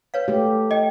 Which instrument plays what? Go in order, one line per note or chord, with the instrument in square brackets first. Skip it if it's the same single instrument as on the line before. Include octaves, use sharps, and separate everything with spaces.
[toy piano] B4 C#5 F5
[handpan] A3 G4
[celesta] D#5 G5